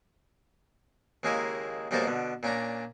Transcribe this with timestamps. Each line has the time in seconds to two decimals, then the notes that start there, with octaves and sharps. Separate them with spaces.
1.23 D#2 C#3 G#3 A#3 E4 G#5
1.91 B1 G3 G#3 A#3 C5 A5
2.07 B2 D3
2.43 A#2 C#4 D4 A#5